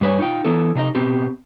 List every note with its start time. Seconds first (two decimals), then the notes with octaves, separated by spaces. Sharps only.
0.01 G2 G3 B4 C#5 G#5
0.19 D#4 F4 G5
0.44 E3 B3 E4 A4
0.75 C3 D4 D#4 D#5
0.95 B2 B3 C4 G4